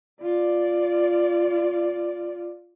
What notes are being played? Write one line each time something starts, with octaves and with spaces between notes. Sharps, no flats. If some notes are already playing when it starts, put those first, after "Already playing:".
F4 D5